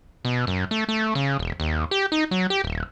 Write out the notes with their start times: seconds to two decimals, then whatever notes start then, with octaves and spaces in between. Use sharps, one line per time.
0.25 B2
0.47 F#2
0.71 A3
0.88 A3
1.15 C#3
1.39 E1
1.60 D#2
1.91 G4
2.12 D#4
2.31 F#3
2.50 G4
2.64 D#1